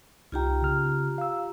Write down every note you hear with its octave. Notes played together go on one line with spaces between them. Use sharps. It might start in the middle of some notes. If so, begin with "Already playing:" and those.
C2 D#4 F4 G4 G5 A#5
C#3 F6
F5 E6